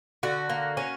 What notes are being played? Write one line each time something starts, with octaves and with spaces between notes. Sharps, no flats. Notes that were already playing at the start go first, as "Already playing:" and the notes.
D3 F#4
A#3
C#4